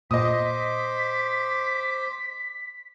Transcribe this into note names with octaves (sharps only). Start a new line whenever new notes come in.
A#2 C5 D#5 D6 D#6 B6